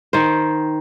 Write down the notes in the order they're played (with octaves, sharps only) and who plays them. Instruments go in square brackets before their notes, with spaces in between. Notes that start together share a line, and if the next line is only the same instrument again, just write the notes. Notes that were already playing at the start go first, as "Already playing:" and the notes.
[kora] D#3 C5